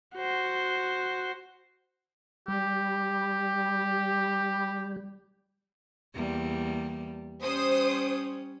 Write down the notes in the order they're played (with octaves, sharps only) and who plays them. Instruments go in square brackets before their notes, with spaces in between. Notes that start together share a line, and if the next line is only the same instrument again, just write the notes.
[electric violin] F#4 C5
[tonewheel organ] G3 [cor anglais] G4
[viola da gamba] E2 G3 A#3
[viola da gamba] G3 C#4 [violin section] C5 D#6